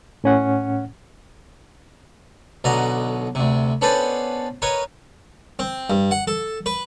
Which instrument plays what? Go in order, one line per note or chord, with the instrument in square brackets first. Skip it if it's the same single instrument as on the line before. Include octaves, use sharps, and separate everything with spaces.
[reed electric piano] A2 C#4 F#5
[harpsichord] B1 B2 D3 D#5 A#5
D2 C3
B3 C#4 D4 A4 B4 C5
A#4 B4 C#5 D#5
C4
G2
F#5
A4
B4